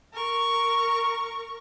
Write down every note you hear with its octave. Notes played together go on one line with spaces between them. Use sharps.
A#4 C#6